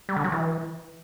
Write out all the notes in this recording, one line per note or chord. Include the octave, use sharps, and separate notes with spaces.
G3
D3
F#3
E3